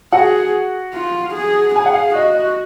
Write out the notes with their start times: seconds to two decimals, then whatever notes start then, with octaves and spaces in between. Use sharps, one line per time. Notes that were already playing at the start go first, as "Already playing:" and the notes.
0.12 F#4 G#4 F#5
0.94 F4
1.34 G#4
1.74 G#4 G#5
1.86 F#5
1.94 F5
2.15 F#4 D#5
2.35 D#5